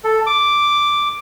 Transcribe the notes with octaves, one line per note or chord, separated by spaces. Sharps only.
A4
D6